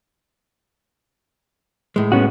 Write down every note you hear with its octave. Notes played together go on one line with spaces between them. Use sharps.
A2 G#3
B3 C#4 F#4